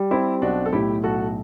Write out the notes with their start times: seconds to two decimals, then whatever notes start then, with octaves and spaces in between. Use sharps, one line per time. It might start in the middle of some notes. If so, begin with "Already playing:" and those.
Already playing: G3
0.11 C4 E4 G4
0.42 B1 D4 F#4
0.66 A4
0.73 A2 E4 G4
1.04 B1 F#4 A4